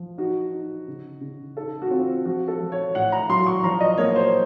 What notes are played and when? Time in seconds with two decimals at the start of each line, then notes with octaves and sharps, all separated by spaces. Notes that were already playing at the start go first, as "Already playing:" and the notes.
Already playing: F3
0.18 D#4 F#4
0.52 D#4
0.88 C#3
1.21 C#3
1.57 D#4 A4
1.82 F#4
1.91 C4 F4
2.25 F3 F#4
2.48 A4
2.60 F3
2.72 C#5
2.94 A2 F#5
3.12 A#5
3.29 F#3 C6
3.47 C#6
3.64 F3 A#5
3.81 D#5
3.98 A#3 C#5
4.16 C5